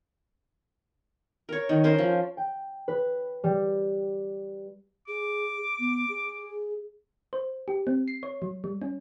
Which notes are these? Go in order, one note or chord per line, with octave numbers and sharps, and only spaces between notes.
A#4 C#5
D#3
C#4 A#4 C5
F3
G5
B4
G3
G#4 D6
B3
G#4
C5
G4
C4
C7
C#5
F#3
G3
C#4